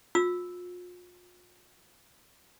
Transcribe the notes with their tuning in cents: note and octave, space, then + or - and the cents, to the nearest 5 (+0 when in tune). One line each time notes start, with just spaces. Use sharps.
F4 +35 E6 -5